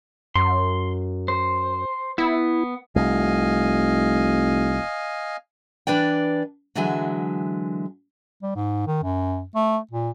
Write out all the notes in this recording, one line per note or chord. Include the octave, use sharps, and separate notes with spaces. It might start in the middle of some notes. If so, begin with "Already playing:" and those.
F#2 C6
C5
B3 E4
F1 C2 D#5 F5 G#5
E3 D4 B4 D5 G5
D3 E3 F#3 G#3 E5 G#5
G3
G#2
D#3
F#2
A3
A#2